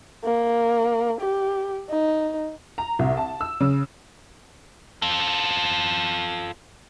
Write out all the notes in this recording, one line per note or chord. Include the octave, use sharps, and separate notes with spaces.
A#3
G4
D#4
A#5
C2
A5
E6
C#3
F4 A4